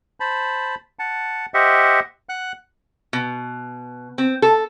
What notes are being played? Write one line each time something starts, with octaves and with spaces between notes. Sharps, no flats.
C5 A5 B5
F#5 A5
G4 C5 D#5 E5 F#5
F#5 F#6
B2
C4
A4